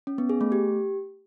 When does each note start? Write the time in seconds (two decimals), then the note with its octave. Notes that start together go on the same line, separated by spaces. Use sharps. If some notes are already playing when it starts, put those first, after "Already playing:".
0.07 C#4
0.18 B3
0.29 G#4
0.41 A3
0.52 G4